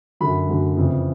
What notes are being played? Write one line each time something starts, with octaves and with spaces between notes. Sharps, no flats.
F#2 D3 F#3 B5
F#2 D3 F#3
F2 C#3 E3